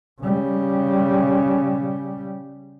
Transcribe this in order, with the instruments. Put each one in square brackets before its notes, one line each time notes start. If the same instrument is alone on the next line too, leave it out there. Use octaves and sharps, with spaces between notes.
[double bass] C#3 G3